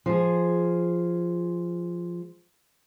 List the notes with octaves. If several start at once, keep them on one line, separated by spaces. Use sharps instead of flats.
F3 G#4